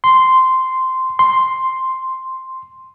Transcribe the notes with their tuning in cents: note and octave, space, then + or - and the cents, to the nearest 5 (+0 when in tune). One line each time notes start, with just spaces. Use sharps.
C6 -10
C6 +0